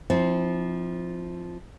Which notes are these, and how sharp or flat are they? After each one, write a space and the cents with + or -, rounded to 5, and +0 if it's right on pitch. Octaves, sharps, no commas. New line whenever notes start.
F3 +0 C4 +5 E4 -35